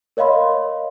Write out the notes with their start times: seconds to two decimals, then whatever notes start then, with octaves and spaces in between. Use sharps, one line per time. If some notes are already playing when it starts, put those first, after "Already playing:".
0.17 A#4 C#5 D#5 F5 B5 C6